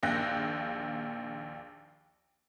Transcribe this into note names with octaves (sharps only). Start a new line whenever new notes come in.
A#1 D#2 F5 G5 F#6 A#6